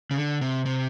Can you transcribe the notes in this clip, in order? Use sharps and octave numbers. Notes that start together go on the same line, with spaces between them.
C#3
D3
C3
C3